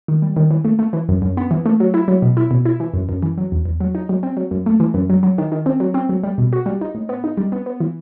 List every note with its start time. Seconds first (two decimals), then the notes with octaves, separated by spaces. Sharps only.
0.08 D#3
0.22 G3
0.36 D#3
0.51 E3
0.64 A3
0.79 A3
0.93 E3
1.09 F#2
1.22 F#2
1.37 B3
1.51 E3
1.66 A3
1.80 F#3
1.94 E4
2.08 F#3
2.22 B2
2.37 E4
2.51 B2
2.65 E4
2.80 E3
2.94 F#2
3.09 F#2
3.23 E3
3.38 F#3
3.52 E2
3.66 E2
3.80 F#3
3.95 D#4
4.09 F#3
4.23 C4
4.37 F#3
4.51 F#2
4.66 A3
4.80 E3
4.94 F#2
5.10 F#3
5.23 F#3
5.38 D#3
5.52 D#3
5.66 C4
5.80 F#3
5.94 C4
6.09 F#3
6.23 G3
6.38 B2
6.53 F#4
6.66 G3
6.81 D#4
6.95 A2
7.09 B3
7.24 D#4
7.37 G3
7.52 B3
7.66 B3
7.80 E3